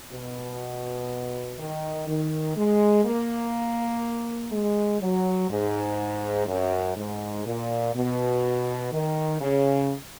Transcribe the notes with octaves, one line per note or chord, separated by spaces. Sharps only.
B2
D#3
D#3
G#3
A#3
G#3
F#3
G#2
F#2
G#2
A#2
B2
D#3
C#3